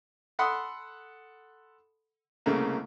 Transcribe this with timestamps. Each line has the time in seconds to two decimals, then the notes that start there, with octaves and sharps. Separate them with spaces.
0.39 A4 F#5 B5 C6 D#6
2.46 C2 C#3 A3 A#3